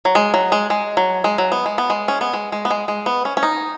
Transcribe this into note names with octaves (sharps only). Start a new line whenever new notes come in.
F#3
G#3
F#3
G#3
G#3
F#3
G#3
F#3
B3
G#3
B3
G#3
C#4
B3
G#3
G#3
B3
G#3
G#3
B3
C#4
C#4
D#4